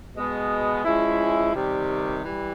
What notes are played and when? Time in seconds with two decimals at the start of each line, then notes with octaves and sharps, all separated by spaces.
0.15 B2 G#3 B3
0.84 F3 G#3 C#4 E4
1.54 C3 D#3 G3
2.23 E3 G3